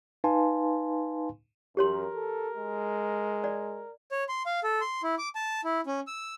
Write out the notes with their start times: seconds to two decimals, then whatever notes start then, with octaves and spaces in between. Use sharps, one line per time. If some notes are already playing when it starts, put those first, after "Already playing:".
0.24 D#4 B4 F5 G#5 A5 C6
1.77 F#2 G4 A#4 C#5 C6
2.14 A4
2.57 G#3
3.44 D5
4.12 C#5
4.29 C6
4.46 F5
4.64 A4
4.81 C6
5.03 E4
5.18 D6
5.35 A5
5.64 E4
5.86 C#4
6.07 E6